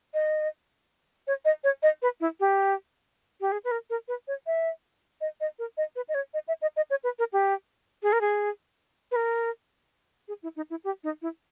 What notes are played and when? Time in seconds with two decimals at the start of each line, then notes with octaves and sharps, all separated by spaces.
0.14 D#5
1.27 C#5
1.45 D#5
1.64 C#5
1.83 D#5
2.02 B4
2.21 E4
2.40 G4
3.41 G4
3.52 G#4
3.64 B4
3.71 A#4
3.90 A#4
4.08 B4
4.28 C#5
4.46 E5
5.21 D#5
5.41 D#5
5.59 A#4
5.77 D#5
5.96 B4
6.09 D#5
6.15 C#5
6.34 D#5
6.48 E5
6.62 D#5
6.76 D#5
6.90 C#5
7.04 B4
7.19 A#4
7.33 G4
8.03 G#4
8.13 A#4
8.21 G#4
9.11 B4
9.16 A#4
10.28 G#4
10.43 E4
10.56 D#4
10.70 E4
10.84 G4
11.04 D#4
11.22 E4